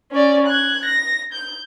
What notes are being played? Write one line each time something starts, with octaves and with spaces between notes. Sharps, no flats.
C#4 D5
F#6 G#6
A#6
G6